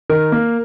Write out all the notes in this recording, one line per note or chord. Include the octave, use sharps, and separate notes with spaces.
D#3 A#4
A#3